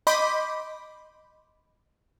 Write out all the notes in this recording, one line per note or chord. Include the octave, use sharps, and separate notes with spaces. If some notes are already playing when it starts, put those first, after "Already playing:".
D#5 B5 C6 D6 G6 B6